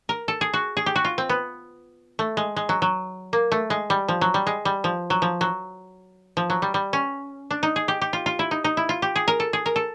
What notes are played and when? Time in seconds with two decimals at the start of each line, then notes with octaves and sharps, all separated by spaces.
0.09 A#4
0.28 A4
0.41 G#4
0.54 F#4
0.77 G#4
0.86 G4
0.96 F#4
1.05 F4
1.18 C4
1.29 B3
2.19 A3
2.37 G#3
2.56 G#3
2.69 F#3
2.82 F#3
3.33 A#3
3.52 A3
3.70 G#3
3.90 G3
4.08 F3
4.21 F#3
4.34 G3
4.47 G#3
4.65 G3
4.84 F3
5.10 F#3
5.22 F3
5.41 F#3
6.37 F3
6.50 F#3
6.62 G3
6.74 G3
6.93 C#4
7.51 D4
7.63 D#4
7.76 G#4
7.88 G4
8.01 G4
8.13 F4
8.26 F4
8.39 E4
8.51 D#4
8.64 D#4
8.77 E4
8.89 F4
9.02 G4
9.16 G#4
9.28 A#4
9.40 A4
9.53 G#4
9.66 A#4
9.76 A4